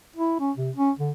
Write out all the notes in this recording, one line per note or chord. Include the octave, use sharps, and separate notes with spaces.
E4
C#4
C3
C#4
D3